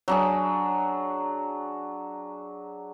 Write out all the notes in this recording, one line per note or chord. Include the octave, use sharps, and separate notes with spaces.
F#3 D4 G#4